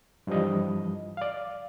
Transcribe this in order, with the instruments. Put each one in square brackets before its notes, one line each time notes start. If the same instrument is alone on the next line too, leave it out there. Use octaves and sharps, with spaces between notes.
[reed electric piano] G2 E3 F3 G3 D#5
D5 F5